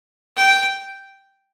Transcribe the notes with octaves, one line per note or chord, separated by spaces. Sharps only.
G5